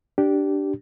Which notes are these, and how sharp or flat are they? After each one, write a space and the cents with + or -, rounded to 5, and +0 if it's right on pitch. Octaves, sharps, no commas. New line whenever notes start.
D4 +0 G4 -15